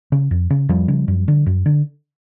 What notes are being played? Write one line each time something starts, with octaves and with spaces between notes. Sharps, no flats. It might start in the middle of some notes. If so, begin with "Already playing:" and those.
C#3
F2
C#3
F2 F3 G3
C#3
F#2
D3
F#2
D3